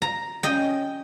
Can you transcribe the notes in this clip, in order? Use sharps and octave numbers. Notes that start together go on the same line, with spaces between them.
A#5
C#4 D#5 G5